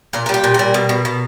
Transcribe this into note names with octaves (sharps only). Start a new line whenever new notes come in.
A#2 A#4
A#4
G3
G4
A#2
G3 A#4
B2
B2
B2